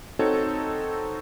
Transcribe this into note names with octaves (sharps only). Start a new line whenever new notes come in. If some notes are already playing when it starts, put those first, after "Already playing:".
C4 D#4 F#4 A4 C#5